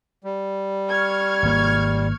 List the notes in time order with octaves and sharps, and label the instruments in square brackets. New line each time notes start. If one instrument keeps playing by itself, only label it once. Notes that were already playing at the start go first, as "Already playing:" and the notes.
[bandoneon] G3
[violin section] C#6 F6 G#6
[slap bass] G#1 A#3